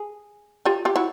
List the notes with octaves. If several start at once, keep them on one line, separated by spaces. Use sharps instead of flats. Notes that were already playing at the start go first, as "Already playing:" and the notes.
Already playing: G#4
F4 G4
F4 G4
E4 F#4